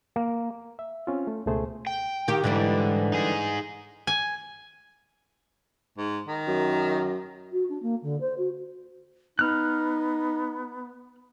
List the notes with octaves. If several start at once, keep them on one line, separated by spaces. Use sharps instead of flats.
A#3
E5
C4 C#4 F4
A3
C#2 B2 A3 G#4 C5
G5
D#3 G4
G#2 D3 E3 G3
D#4 G#4
G#5
G#2
D#3
F#2
F#4
D4
A#3
D3
C5
F#4
B3 D#4 F6 F#6